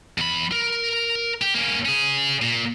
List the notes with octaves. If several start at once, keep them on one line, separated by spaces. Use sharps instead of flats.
E2 B5
A#4
G4
A#3 C#4
C#4 G#4
A#2